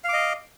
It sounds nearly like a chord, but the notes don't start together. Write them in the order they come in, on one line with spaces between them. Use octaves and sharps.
F5 D6 D#5